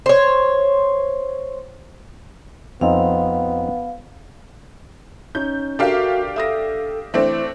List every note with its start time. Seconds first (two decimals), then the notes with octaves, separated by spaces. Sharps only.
0.06 C5 C#5
2.81 F2 B3 C4 D#4 F5
5.35 C#4 D#4 G6
5.79 D4 F#4 G4 A4 A#4 E5 F5
6.36 A4 E5 D#6 A#6
7.14 E3 A3 C4 D4 C5